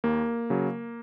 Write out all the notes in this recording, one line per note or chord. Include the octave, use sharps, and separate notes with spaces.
D#2 A#3
C#3 F#3